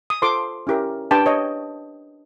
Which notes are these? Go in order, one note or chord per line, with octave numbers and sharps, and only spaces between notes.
D#6
F4 A4 C5 C6 D6
C#4 E4 G4 A#4
D4 G4 B4 G5 A5
C#5 D#5